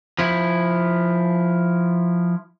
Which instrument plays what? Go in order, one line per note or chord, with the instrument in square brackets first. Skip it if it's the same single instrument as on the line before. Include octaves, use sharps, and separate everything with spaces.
[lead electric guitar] F3 E4